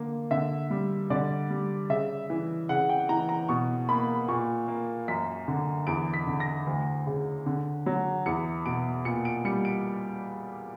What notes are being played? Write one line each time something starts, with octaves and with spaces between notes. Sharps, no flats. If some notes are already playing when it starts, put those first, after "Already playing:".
Already playing: D3 A#3
D3 E5
G3
D3 D5
G3
C#3 E5
E3
C#3 F#5
G5
E3 A#5
A#5
B2 C#6
A#3 B5
A#2 C#6
A#3
F#2 B6
D3
E2 D7
B6
D3
A#6
D2
C#3
D3
F#3
E2 C#7
B2 D7
A#2 C#7
D7
G3 C#7
D7